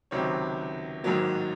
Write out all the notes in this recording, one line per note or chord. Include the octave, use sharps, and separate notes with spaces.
C#2 C3 D#3 F#3 C#5
A1 G#2 D#3 F#3 A#3